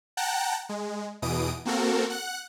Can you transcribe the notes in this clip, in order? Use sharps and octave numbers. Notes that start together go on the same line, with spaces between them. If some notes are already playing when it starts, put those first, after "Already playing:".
F#5 G5 A5 A#5 F#6
G#3
E2 B2 E3 D#6 D7
A#3 C4 F#4 A4 A#4
F#5 F#6